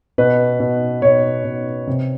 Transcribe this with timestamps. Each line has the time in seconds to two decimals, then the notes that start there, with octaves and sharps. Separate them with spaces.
0.18 B2 B4
0.60 B2
1.02 B2 C#5
1.44 B2
1.87 C3